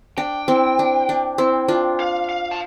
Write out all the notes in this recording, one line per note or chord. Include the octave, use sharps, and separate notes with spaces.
D4 G5
C4 E4
D4
D4
C4 E4
D4 F4
F5
F5
A5